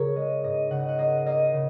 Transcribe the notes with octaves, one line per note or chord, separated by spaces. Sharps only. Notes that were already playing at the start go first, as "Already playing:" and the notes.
Already playing: C#3 G#4 A#4 C#5
G#3 D#5
G#2 D#5
C#3 F#5
D#5
F#5
A#3 D#5
A#3 D#5
C#3